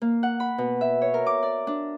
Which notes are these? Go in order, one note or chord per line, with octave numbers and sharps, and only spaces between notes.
A#3
F#5
B5
B2
E5
C#5
A#4
D6
D5
D4